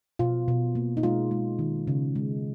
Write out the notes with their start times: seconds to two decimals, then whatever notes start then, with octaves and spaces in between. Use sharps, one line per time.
0.19 B2 F4
0.48 B2
0.75 A#3
0.97 D#4
1.03 G#3 F4
1.31 G#3
1.59 D#3
1.87 C#3
2.15 G#3